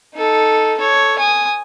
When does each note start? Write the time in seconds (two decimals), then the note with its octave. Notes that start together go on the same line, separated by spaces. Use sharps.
0.15 D#4 A4
0.78 A4 C#5
1.19 G#5 D#6